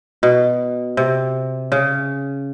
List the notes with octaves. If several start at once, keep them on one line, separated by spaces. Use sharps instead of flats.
B2
C3
C#3